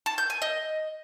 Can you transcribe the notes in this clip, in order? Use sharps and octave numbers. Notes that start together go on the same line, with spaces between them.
A5
G6
G#5
D#5